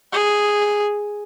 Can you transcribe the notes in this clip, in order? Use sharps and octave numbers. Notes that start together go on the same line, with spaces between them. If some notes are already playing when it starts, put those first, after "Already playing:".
G#4